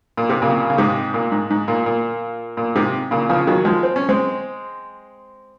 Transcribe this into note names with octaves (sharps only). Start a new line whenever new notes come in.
A#2
C3
A#2 C#3
C#3
G#2 C3
A#2
G#2
G#2
A#2
A#2
A#2
G#2 C3
A#2 C#3
C#3 F3
D#3 F#3
F3 G#3
C4
C#4
G#3 C4